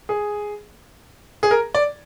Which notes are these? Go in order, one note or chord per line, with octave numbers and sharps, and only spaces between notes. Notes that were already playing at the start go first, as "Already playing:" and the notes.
G#4
G#4
A#4
D5